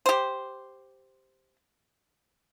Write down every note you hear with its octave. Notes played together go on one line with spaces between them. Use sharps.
G4 C5